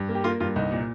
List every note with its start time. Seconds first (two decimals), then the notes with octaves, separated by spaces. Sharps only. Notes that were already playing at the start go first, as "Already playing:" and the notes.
Already playing: G2
0.09 A#3
0.15 G4
0.24 A#3 F4
0.40 G2 F4
0.56 C2 D#4
0.71 A#2